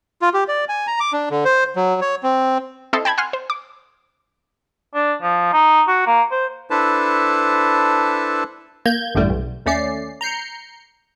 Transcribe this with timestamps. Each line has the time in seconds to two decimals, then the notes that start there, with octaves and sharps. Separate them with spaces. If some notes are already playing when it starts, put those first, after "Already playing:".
0.22 F4
0.34 G4
0.48 D5
0.69 G#5
0.87 A#5
1.00 D6
1.13 D4
1.31 D3
1.45 C5
1.76 F#3
2.01 C#5
2.23 C4
2.93 C4 E4 A4 D#5 C6
3.05 G5 A5 B5 G#6
3.18 F#5 G#5 C6 F6
3.33 C5
3.50 D6
4.94 D4
5.22 F3
5.53 D#4
5.88 F#4
6.07 A#3
6.31 C5
6.70 D4 E4 A4 B4 C5 A5
8.85 A#3 G6 G#6
9.15 A1 F#2 A2 D3 G3 A3
9.30 B1
9.66 D#2 A3 C#4 D5 C7
10.21 A#5 G6 C7 C#7